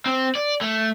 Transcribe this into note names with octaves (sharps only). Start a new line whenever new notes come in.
C4
D5
A3